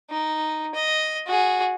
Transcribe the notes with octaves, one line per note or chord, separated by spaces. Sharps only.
D#4
D#5
F#4 G#4